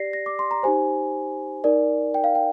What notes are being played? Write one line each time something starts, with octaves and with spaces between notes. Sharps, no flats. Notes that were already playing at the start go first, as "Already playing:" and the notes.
Already playing: G4 D5 A#6 C7
A#6
D6
C6
A#5
D#4 G4 C5 G#5
D#4 A#4 D5
G5
F5
G5